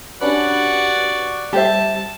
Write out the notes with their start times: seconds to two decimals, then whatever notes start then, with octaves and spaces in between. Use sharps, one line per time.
0.21 C#4 D4 F#4 G4 B4 D5 F#5
1.53 G3 G4 C5 E5 A5